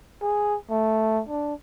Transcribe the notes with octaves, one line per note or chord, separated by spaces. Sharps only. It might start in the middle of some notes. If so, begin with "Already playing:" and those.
G#4
A3
D4